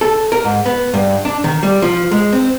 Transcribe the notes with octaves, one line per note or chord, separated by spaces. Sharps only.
A4
A#4
G#2
B3
G2
D4
D#3
G3
F3
G#3
C4